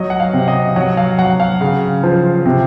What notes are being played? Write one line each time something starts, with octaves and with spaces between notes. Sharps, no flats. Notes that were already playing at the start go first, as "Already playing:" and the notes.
Already playing: F#3 D#5
F#5
F5
C3
D#5
F#3 F#5
F5
F#3 F#5
F5
C#3
F3
C3